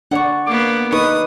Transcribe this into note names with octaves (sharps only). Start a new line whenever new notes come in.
D4 D5 F#5 C#6
A#3 B3 D6
D#4 B4 C#6 D#6